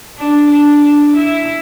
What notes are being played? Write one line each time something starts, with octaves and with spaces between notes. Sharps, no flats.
D4
D4
D4
E4